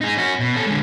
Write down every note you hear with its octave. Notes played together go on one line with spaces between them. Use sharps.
D#4 G#4
C#4 F#4
B2
C#4 A4
D3 G#3